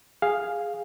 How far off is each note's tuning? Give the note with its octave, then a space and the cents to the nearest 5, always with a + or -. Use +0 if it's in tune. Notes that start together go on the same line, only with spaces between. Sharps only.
G#4 -10 F5 +0